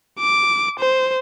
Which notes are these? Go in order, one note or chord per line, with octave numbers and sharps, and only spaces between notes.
D6
C5